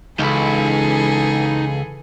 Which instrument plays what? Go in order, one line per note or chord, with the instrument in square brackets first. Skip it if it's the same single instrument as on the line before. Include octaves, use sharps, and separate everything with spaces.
[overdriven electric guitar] C#2 [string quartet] E3 G#4 A4 [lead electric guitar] D#4 B5